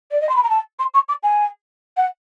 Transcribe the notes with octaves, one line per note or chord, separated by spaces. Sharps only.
D5
D#5
C6
B5
A#5
A5
C6
C#6
D6
G#5
F#5